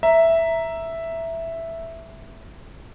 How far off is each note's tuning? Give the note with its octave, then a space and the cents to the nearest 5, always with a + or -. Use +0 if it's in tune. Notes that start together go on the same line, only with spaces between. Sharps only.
E5 +0 A#5 +0